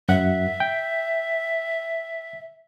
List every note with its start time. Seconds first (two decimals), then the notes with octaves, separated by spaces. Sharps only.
0.09 F#2 E5 F#5
0.60 G5